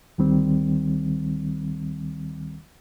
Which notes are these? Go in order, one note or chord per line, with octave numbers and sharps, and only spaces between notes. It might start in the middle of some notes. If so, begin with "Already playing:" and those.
D2 D#3 G3 C4